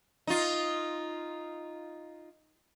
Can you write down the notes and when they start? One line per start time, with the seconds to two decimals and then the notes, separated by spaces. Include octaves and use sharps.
0.27 D#4 F4